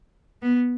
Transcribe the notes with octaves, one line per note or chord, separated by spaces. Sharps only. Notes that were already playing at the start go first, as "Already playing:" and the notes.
B3